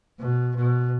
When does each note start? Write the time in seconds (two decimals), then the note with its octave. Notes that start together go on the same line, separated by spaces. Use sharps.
0.19 B2
0.56 B2